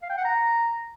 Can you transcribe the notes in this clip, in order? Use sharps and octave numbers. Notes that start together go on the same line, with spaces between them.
F5
G5
F#5
A#5